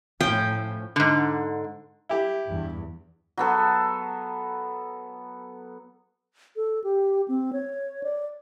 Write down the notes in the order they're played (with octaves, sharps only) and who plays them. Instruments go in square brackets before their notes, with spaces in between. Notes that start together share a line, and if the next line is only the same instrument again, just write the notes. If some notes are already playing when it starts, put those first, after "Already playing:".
[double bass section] A2 [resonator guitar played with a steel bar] F3 C#4 [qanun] G5
[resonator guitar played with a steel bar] G#2 D3
[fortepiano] E4 G4
[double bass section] E2 G2
[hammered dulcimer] F#3 B3 A4
[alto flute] A4
G4
C4
C#5
D5